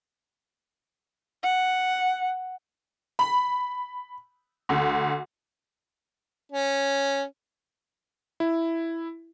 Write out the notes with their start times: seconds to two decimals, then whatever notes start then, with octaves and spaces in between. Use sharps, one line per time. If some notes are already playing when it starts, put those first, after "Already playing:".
1.43 F#5
3.19 B5
4.69 D2
6.52 C#4
8.40 E4